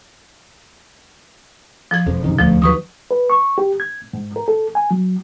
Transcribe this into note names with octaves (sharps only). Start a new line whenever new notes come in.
F3 G#6
E1 F2
F#2 C3 D#3
D#1 D2 F3
D#2 F#3 B4 C#6 D#6
B4
C#6
G4
G#6
G#2
A#4
A4
G#5
F#3